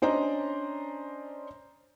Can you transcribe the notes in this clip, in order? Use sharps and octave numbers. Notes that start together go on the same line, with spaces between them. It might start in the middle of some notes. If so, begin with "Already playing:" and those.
C#4 D4 C5 D5 D#5 A#5